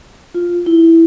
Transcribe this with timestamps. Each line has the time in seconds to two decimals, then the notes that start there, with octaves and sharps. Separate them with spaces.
0.34 F4
0.66 E4